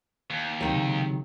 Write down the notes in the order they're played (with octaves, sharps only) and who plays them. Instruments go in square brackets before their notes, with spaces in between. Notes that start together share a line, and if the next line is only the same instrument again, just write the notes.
[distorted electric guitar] D#2
[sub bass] D2 [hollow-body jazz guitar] C3 D#3 F#3
[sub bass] C#3